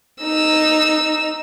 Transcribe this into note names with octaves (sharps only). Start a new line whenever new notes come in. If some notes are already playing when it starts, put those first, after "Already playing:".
D#4 E6